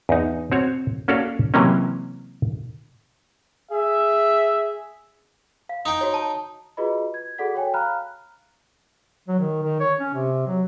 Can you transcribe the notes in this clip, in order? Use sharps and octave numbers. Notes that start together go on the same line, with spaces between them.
E2 D#4
C4 F#4 C#5
A#3 C#4 F#4 A4 D5 F5
C3 E3 F#3 A#3 C#4
G#4 E5
F5
D#4 G5
F#4 C#5
A5
F4 F#4 G#4 B4 D#5 B5
G#6
F#4 G#4 A4 D5 F#5 B6
F#4 C#5 G5 G#5
F5 A#5 B5 F6 F#6
F#3
D#3
D#3
C#5
C#4
C3
F#3